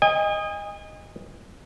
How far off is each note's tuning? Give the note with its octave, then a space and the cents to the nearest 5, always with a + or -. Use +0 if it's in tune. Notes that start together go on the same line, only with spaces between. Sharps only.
D#5 +0 G#5 -40